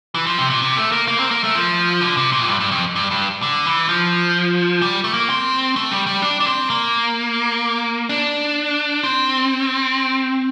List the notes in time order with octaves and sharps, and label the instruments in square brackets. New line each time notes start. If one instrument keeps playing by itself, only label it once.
[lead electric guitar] E3
F3
C3
A#2
C3
A3
A#3
A#3
C4
A#3
A3
F3
D3
C3
A#2
F2
G2
G2
F2
G2
G2
D3
E3
F3
G3
A3
A#3
C4
A3
G3
G3
D4
D4
C4
A#3
D4
C4